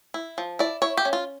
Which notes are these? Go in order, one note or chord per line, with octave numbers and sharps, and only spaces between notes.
E4
F3
E4 D5
E4 C#5
G4
C#4
F4